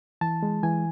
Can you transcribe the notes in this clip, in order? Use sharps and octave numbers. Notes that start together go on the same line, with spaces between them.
E3 A5
G#3
E3 G#5